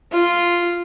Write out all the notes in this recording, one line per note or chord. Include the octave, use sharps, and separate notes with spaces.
F4